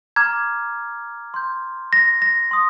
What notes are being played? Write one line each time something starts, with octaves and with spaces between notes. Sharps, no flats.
A#5 D6 F6 G#6
C6 G6
A#6
A#6
C6 D#6